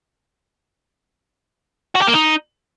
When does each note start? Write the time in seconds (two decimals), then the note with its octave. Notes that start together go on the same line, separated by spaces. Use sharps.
1.95 F#4
2.01 G4
2.07 A#3
2.14 D#4